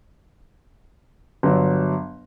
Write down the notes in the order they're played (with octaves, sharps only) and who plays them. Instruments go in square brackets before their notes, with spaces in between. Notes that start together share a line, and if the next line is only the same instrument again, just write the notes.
[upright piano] G1 F#3